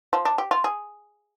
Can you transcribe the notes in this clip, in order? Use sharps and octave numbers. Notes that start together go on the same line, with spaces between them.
F3
D4
G4
F4
G#4